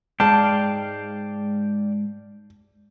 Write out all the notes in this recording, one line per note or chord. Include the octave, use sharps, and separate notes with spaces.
G#2 G#3 D5 F5 G5 A5